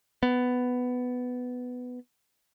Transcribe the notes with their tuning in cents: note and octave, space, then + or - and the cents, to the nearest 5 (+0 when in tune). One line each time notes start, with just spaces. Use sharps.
B3 +10